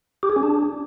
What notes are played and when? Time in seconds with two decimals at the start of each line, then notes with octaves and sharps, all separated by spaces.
0.23 G4
0.30 G#4
0.36 C#4
0.43 D4